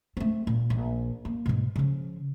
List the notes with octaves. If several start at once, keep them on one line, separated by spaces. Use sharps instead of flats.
A3 C4
A#2
A#1
A#3
G#2 B2
C#3 F3